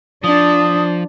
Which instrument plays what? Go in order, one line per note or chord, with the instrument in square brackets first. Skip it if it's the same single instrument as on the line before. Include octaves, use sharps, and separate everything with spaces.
[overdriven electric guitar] F3 [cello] D4 [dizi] D#6